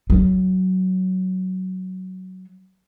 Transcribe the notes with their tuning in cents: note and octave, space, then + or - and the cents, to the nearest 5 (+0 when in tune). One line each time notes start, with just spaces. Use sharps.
F#3 +10